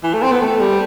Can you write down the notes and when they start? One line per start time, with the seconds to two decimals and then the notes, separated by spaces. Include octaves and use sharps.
0.04 E3
0.14 A3
0.23 C4
0.32 B3
0.42 A3
0.60 G3